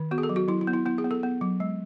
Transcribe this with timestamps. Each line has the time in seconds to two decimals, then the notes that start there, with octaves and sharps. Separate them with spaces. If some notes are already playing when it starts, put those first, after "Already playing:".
Already playing: D#3
0.11 B3 F#4
0.18 G#4
0.23 A4
0.29 F#3
0.36 F#4
0.48 F#3 E4
0.61 E4
0.67 B3
0.73 E4
0.85 B3 E4
0.98 G#4
1.04 B3
1.11 A4
1.23 B3
1.41 F#3
1.60 G#3